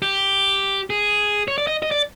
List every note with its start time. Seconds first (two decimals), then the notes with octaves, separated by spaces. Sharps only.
0.02 G4
0.90 G#4
1.48 C#5
1.58 D5
1.67 D#5
1.82 D#5
1.91 D5